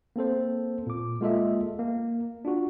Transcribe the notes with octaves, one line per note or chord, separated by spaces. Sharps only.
A#3 C4 A4 C5
A#2 D6
G#3 A#3 F4 A4 D#5 E5
A#3
D4 F4 F#4